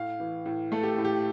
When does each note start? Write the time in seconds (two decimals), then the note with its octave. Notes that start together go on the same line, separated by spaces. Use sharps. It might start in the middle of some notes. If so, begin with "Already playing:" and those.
Already playing: A2 F5
0.20 E3
0.46 A2
0.72 A3 A4
0.83 G4
0.98 A2
1.05 G4